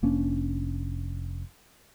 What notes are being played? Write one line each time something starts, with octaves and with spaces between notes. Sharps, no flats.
F1 A#3 C#4 D4